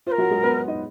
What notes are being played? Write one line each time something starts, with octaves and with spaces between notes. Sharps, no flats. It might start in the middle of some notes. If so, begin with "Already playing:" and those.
F4 A#4 C5
F#3 F#4
G#3 G#4
B3 B4
D#4 D#5